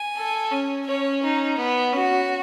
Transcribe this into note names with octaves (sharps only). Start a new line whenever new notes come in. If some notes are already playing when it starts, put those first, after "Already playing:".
Already playing: G#5
A4
C#4
C#4 C#5
D#4
B3
C#4 F#4